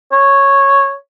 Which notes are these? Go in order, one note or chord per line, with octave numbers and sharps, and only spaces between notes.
C#5